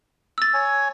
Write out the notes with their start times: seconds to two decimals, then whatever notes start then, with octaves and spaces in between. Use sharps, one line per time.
0.38 E6 A6
0.54 C#5 G#5